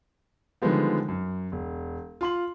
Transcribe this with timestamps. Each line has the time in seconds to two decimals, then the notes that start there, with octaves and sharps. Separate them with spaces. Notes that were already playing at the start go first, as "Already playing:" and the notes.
0.62 D3 D#3 F3 G3 G#3 B3
1.08 F#2
1.52 E1
2.21 F4 C6 F#7